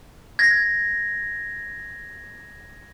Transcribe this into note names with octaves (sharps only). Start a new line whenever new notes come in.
G#6 A#6